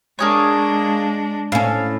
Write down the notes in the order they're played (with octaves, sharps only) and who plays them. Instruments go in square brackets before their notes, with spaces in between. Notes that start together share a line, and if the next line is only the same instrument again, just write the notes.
[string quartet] G#3 D4 [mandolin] A#3 G#4 C#5
[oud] A2 C#4 [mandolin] F5